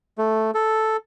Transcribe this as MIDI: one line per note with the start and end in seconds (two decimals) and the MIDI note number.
0.18 0.51 57
0.54 0.97 69